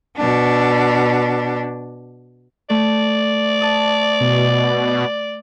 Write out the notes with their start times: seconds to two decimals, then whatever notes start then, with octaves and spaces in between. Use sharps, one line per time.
0.17 B2 D4
2.70 A3 D5
3.61 A5 D#6
4.21 B2